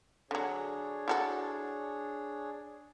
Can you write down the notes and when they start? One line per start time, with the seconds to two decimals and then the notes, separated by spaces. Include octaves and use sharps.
0.31 D3 F#3 D4 G#4 C#5
1.08 E4 F#4 A4